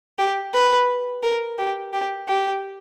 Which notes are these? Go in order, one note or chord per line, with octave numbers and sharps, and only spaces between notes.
G4
B4
A#4
G4
G4
G4